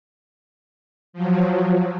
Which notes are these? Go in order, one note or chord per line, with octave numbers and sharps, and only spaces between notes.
F3 F#3